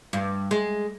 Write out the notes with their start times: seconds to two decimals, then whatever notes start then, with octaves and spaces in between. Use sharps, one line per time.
0.13 G2
0.51 G#3